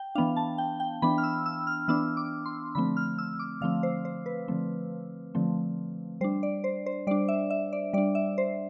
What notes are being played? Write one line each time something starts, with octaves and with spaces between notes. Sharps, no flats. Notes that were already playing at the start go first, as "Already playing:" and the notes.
Already playing: G5
E3 B3 D4 F5
A5
G5
G5
E3 B3 D4 B5
F6
E6
E6
F6
E3 B3 D4 E6
D6
C6
D3 F3 A3 C4 B5
F6
E6
D6
D3 F3 A3 C4 F5
C5
C5
B4
D3 F3 A3 C4
D3 F3 A3 C4
G3 D4 C5
D5
C5
C5
G3 D4 D5
E5
E5
D5
G3 D4 D5
E5
C5